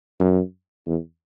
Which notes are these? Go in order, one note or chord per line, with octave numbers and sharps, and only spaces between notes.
F#2
E2